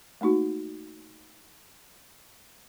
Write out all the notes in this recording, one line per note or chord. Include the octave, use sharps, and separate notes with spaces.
A3 A#3 D#4 F#4